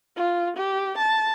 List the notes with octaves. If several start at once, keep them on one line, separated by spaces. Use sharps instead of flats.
F4
G4
A5